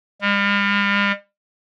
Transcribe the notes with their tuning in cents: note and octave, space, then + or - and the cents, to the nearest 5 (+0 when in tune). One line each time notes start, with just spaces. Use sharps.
G3 +45